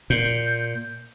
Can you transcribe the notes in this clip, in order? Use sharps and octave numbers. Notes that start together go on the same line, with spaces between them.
A#2 G6